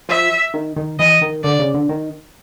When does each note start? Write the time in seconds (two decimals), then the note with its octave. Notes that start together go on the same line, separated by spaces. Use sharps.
0.09 F3 E5
0.54 D#3
0.76 D#3
0.99 E3 D#5
1.21 D#3
1.44 D3 D5
1.59 C#3
1.74 D3
1.89 D#3